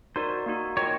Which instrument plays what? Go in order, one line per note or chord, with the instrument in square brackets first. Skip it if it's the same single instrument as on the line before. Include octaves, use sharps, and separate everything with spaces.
[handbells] D#4 F#4 A#4 D5 [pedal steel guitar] C5
[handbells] A#3 D#4 F#4
[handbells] F4 A#4 D#5 G5 [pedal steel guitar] C#5